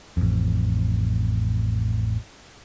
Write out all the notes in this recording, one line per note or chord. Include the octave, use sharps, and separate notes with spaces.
A1 F2